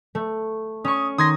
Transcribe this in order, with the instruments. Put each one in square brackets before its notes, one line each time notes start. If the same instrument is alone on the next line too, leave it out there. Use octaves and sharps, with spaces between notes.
[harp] A3
[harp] C#4 C#6 [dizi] D#6
[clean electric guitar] D#3 [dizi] C6 [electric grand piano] D#6 G#6 A#6